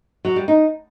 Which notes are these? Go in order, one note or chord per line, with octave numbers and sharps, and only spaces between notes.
F#3
G3
D#4